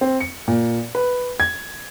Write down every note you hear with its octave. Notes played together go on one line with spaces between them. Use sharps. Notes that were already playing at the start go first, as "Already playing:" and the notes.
C4
C#7
A#2
B4
G#6